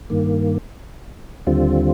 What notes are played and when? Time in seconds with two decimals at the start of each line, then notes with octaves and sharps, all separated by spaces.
0.10 G2 D#3 A#3
1.47 D#2 D3 G3 C4 F4